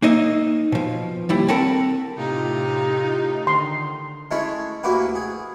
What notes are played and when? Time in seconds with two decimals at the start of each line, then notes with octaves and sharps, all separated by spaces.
0.02 A#3 D#4 D#5 E5
0.72 B2 F3
1.29 D#2 G3 E4
1.48 C4 A4 A#4 F#5 A5 B5
2.17 A2 C3 D#4 F4 G4
3.47 D3 D#3 C6
4.31 G#3 A3 C#4 E4
4.83 D2 A#3 E4 F#4 G4 B4
5.15 G#4